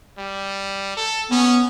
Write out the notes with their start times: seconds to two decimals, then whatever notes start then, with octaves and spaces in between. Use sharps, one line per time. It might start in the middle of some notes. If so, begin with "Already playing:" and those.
0.18 G3
0.97 A4
1.31 B3 C#4